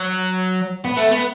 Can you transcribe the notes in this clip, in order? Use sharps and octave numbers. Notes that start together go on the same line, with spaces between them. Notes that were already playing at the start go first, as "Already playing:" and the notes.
Already playing: F#3
B3
A3
B3